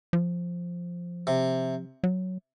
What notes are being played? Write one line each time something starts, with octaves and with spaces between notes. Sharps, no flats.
F3
C3
F#3